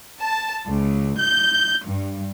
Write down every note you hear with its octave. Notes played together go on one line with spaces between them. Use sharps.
A5
C#2
G6
G2